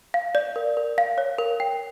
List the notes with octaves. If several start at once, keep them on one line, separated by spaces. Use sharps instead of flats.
F5
D5
A#4
A#4
F5
C#5
A#4
G5